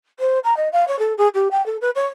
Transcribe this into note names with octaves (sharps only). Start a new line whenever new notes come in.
C5
A#5
D#5
F5
C#5
A4
G#4
G4
G5
A4
B4
C#5